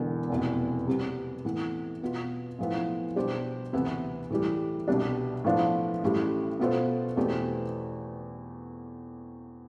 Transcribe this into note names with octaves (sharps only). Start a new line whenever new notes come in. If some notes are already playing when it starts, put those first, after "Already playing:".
Already playing: E1 E2 D3
F1 E2 B2
C3 G3 B3
A2 E3 B3
B2 B3 F4
B1 A2 F3 B3 E4
B2 G3 D4 G4 C5
D2 C3 E3 B3 E4
A2 E3 G3
C2 B2 G3 D4
A2 F3 B3 D4
A1 A2 G3
B2 B3 F4 A4 C5
E2 B2 A3 C4 G4